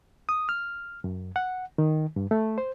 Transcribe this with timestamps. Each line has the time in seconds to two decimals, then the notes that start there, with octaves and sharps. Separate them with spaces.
0.29 D#6
0.49 F6
1.04 F#2
1.36 F#5
1.78 D#3
2.16 G2
2.31 A3
2.58 C5